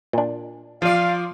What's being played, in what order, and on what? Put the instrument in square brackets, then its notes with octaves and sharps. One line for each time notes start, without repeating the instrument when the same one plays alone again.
[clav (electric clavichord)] A#2 D4
[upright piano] F3 [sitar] F4 D5 [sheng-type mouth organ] F5